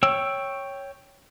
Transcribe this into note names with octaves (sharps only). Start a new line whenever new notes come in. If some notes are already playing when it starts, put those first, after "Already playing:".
C#5 G5 E6